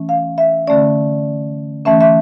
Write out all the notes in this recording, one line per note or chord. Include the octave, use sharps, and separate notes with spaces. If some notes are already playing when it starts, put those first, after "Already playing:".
Already playing: E3 A3 C#4
F5
E5
D3 A3 C#4 D5
E3 A3 C#4 E5
E5